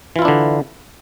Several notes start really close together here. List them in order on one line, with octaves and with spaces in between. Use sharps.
E3 F4 E4 D4 D3